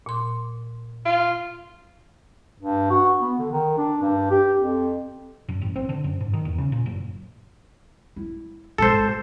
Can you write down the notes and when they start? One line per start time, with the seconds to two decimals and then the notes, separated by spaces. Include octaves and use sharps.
0.06 A#2 C6
1.05 F4
2.60 G2
2.90 F#4
3.20 B3
3.39 D3
3.52 D#3
3.78 D4
4.02 G2
4.31 G4
4.58 F2
5.49 F#2
5.61 A1
5.76 C4
5.89 D3
6.04 F#2
6.20 G#2
6.33 D#3
6.45 E2
6.58 C#3
6.72 A#2
6.86 F#1
8.16 E4
8.78 G#1 G#2 A4 C5